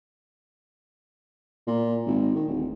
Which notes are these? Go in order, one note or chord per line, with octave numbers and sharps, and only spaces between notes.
A#2
G#1
D#3
D1